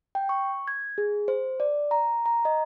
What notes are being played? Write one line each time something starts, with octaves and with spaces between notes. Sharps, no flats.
G5
C#6
G#6
G#4
C5
D5
A#5
A#5
D#5